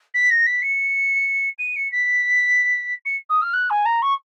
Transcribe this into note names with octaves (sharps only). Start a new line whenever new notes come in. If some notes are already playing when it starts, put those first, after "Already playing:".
B6
A#6
B6
C#7
D#7
C#7
B6
C#7
D#6
F6
F#6
G#5
A#5
C#6